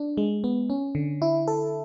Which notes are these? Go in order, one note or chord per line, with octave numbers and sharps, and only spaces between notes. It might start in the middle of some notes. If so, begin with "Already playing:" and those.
Already playing: D4
G#3
B3
C#4
D3
E4
A4